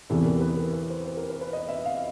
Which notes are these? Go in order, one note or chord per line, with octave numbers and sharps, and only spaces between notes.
E2 C3 E3 G3 B3 A4
A#4
B4
A#4
B4
C5
C5
A#4
B4
B4
D#5
E5
F5